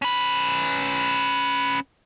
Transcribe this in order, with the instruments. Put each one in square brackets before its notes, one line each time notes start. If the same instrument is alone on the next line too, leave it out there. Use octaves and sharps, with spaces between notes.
[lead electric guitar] C#4 B4